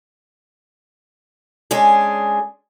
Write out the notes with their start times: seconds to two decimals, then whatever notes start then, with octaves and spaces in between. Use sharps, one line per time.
1.71 G#3 C#4 D4 G#4